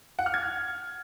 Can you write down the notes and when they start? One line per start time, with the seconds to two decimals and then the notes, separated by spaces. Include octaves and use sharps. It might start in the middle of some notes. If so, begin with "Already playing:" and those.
0.19 F#5
0.26 F6
0.34 G#6